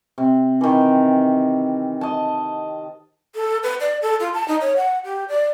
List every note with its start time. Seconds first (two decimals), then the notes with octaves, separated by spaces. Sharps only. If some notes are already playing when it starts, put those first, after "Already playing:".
0.18 C3
0.61 D#3 E3
2.01 D#5 A5
3.35 A4
3.63 B4
3.81 D5
4.02 A4
4.20 F4
4.34 A5
4.48 D#4
4.61 C#5
4.77 F#5
5.05 G4
5.29 D5